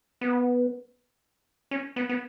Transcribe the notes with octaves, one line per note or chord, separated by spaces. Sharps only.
B3
C#4
B3
B3